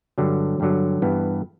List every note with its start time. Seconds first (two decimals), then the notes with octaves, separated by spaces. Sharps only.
0.18 G2 D3 F#3
0.60 G2 D3 F#3
1.02 G2 E3 B3